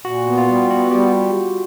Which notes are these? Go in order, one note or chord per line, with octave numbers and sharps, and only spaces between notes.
A#2 F#4
B3
F4
G3
B3 F#4
G3 G4